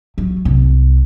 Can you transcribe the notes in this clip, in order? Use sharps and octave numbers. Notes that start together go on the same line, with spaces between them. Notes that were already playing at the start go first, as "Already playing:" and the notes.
F#3
C2